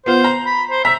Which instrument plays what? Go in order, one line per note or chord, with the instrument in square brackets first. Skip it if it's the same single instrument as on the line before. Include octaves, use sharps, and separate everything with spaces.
[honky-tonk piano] B3 F4 [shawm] C5
[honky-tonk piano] A#5
[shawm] B5
C5
[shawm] E5 [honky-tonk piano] A#5 B6